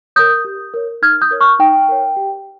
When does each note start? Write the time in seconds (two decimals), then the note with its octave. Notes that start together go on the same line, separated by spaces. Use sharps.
0.16 A#4 C#5 D#6 G6
0.45 G4
0.74 A#4 C#5
1.02 D#4 F6 G#6
1.22 D#6 G6
1.31 A#4 C#5
1.41 C#6 F6
1.59 D#4 G5
1.89 A#4 C#5
2.16 G4